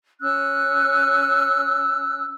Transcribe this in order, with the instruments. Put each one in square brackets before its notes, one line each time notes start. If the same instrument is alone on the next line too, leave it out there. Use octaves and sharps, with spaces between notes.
[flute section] C#4 E6 F#6